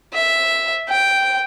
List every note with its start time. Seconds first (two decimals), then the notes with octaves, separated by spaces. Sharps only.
0.13 E5
0.89 G5